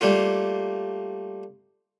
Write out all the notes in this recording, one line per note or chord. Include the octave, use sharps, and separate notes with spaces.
G3 A3 A#3 F4